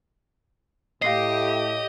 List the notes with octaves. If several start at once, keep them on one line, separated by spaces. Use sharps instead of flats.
A2 G4 D#5 F5 C7